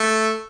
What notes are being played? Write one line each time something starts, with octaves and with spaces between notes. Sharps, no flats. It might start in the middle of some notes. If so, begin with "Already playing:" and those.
Already playing: A3